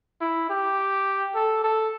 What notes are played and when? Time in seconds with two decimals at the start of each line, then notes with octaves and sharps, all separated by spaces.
0.21 E4
0.50 G4
1.35 A4
1.64 A4